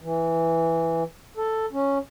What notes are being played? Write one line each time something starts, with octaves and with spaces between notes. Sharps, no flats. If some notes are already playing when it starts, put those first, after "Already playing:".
E3
A4
C#4